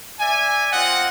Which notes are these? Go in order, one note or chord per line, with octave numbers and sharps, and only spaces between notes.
D5 E5 G#5
C4 F4 D#5 F#5